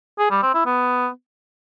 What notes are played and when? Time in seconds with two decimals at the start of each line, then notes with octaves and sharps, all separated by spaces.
0.19 G#4
0.31 G3
0.43 C4
0.54 E4
0.66 B3